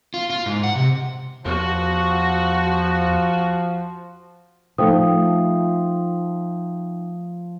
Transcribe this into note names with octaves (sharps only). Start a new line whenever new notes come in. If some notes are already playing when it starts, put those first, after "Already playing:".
F4
F4
G#2
F#5
C3
E2 F3 F#4
F3 A3 D#4 G5 D#6